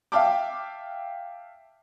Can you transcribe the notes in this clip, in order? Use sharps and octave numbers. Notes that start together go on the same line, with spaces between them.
E5 F5 G5 A5 D6